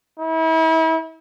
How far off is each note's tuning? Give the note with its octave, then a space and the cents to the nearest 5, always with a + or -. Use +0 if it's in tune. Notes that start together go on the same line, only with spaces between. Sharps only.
E4 -35